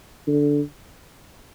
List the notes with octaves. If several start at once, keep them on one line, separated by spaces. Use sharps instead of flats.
D3